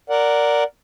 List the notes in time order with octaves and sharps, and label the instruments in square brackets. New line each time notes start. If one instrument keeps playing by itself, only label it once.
[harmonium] A#4 D5 F#5